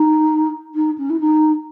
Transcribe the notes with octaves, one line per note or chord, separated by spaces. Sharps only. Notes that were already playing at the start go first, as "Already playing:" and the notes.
Already playing: D#4
D#4
C#4
E4
D#4